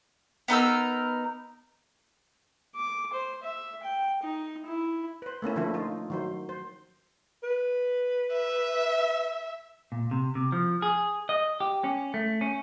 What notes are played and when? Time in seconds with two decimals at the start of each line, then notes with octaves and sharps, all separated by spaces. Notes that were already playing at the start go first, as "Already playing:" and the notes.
0.48 B3 D#4 A#4 E6
2.76 D6
3.13 C5
3.43 E5
3.83 G5
4.23 D#4
4.66 E4
5.22 B4 C5
5.42 A3 A#3 C#4 E4
5.56 D3 F3 A3 A#3 E4
5.74 D#4 F4
6.10 D#3 F#3 C5
6.49 C5
7.43 B4
8.33 E5
9.92 A#2
10.11 C3
10.35 C3
10.52 F3
10.82 G#4
11.29 D#5
11.60 G4
11.84 C#4
12.14 A3
12.41 C#4